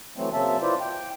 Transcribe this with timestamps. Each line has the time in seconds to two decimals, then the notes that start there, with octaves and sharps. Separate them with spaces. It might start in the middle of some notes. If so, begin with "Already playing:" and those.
0.17 E3 F#3 A3 C4
0.33 C#3 F#3 A#3 C4 E5 A5
0.62 E4 F4 B4 C5 D5
0.81 G5